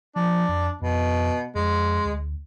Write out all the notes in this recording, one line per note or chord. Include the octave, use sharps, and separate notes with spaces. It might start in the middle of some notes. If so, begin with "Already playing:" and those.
F3 D4
F2
F2 B2
F2 G#3
D2